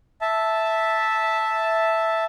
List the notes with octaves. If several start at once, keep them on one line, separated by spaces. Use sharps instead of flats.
E5 A5